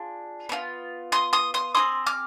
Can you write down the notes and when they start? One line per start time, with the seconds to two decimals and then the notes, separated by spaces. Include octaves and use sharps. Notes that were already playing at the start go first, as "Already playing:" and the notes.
Already playing: D4 F4 G#4
0.49 B3 D4 F4
1.12 C6 D#6
1.33 C6 D#6
1.54 C6 D#6
1.75 C4 F4 G#4 C6 D#6
2.06 D6 F6